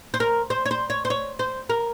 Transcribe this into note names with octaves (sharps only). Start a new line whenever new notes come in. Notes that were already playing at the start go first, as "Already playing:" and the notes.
C5
A#4
C5
C#5
C5
C#5
C5
C#5
C5
A#4